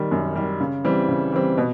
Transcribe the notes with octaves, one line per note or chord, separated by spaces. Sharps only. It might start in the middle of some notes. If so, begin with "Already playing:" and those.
Already playing: D#3 G3
F#2
D#3 G3
C#3
E3 G3 C4
C#3
E3 G3 C4
B2